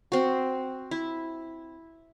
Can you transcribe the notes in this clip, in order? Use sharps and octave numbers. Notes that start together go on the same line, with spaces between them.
C4 F#4
E4